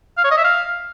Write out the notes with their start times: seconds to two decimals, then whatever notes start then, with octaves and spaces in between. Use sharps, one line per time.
0.18 F5
0.24 C#5
0.31 D#5
0.38 E5
0.44 F5